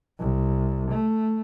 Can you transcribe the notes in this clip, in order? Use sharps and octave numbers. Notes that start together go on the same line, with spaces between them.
C2
A3